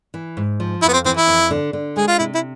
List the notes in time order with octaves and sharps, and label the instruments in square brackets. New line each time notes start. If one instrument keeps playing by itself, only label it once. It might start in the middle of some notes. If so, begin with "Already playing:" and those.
[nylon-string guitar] E3
G#2
F3
[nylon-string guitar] F2 [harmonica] E4
[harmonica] B3
C4
[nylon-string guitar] E3 [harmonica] C4
[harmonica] E4
[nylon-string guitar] F2
D3
D3
[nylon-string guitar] G#3 [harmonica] G#4
[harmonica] F4
[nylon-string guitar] C3 [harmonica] E4
[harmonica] E4